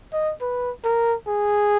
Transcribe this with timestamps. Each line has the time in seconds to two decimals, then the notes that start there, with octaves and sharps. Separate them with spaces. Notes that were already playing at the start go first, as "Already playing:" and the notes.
0.13 D#5
0.41 B4
0.84 A#4
1.27 G#4